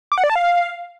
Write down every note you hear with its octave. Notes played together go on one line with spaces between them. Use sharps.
D6
F#5
D5
A5
F5